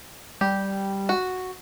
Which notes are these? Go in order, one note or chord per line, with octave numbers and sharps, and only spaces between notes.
G3 G4
F#4